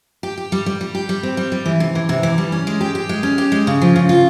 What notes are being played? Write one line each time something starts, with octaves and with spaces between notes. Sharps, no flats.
G4
G4
G3
G3
G3
G4
G3
C4
G3
G3
E3
C3
E3
C3
E3
G3
C#4
G#3
G4
G4
G#3
C#4
G4
G#3
C#3
F3
C#3
F4